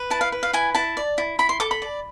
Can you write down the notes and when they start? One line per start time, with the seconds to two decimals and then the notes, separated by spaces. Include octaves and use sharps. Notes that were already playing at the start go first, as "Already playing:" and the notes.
Already playing: B4
0.10 E4 A5
0.21 F5
0.32 B4
0.43 F5
0.53 E4 G#5
0.75 E4 A5
0.97 D5
1.18 E4
1.39 E4 B5
1.49 C6
1.60 A4 D6
1.71 B5
1.82 D5